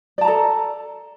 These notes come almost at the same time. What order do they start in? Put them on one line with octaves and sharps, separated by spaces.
D5 A5 A#5 A4